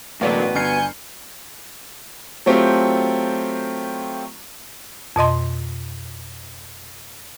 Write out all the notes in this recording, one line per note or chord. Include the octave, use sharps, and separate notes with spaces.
A1 B2 D3 F#3 A#3 B3 D5
G1 G#5 F6 G6 C7 C#7
F#3 A3 C4 F4 G4
F2 B2 D#5 C6